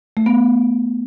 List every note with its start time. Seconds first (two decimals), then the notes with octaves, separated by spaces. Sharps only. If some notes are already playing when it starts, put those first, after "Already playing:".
0.17 A3
0.26 B3